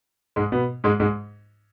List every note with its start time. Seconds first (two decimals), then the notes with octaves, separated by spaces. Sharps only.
0.36 G#2 G#3
0.52 B2 B3
0.84 G#2 G#3
1.00 G#2 G#3